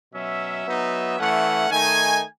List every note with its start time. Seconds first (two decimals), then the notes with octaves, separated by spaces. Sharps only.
0.13 B2 F#3 C#4 E5
0.65 F#3 B3 D#4
1.18 E3 A3 C#4 F#5
1.69 D#3 A3 D#4 G#5